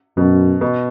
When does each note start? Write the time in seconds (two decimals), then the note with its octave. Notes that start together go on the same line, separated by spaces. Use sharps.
0.17 F#2 B2
0.61 B2